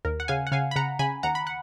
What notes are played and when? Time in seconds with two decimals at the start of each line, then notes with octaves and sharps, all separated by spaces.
0.05 D#2 A#4
0.20 F#5
0.28 C#3 F5 G#5
0.47 F#5
0.52 C#3 F5 G#5
0.71 B5
0.76 C#3 F#5 A#5
0.99 C#3 G#5 B5
1.23 D#2 F#5 A#5
1.35 B5
1.47 F#5